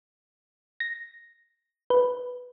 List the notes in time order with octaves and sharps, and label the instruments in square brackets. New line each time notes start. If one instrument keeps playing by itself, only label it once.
[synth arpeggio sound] A#6
B4